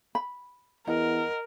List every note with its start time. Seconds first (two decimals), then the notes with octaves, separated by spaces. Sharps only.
0.15 B5
0.87 E2 A#4 D#5 F#5